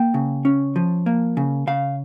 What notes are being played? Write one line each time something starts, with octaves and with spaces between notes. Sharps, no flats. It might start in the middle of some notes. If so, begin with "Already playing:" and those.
Already playing: A#3 G5
C#3
C#4
F3
A#3
C#3
C#3 F5